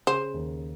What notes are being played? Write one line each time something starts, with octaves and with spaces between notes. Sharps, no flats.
C#3 C5
D#2